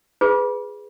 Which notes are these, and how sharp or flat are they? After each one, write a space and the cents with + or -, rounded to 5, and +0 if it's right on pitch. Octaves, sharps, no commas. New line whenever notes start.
F4 +20 G#4 +0 B4 +15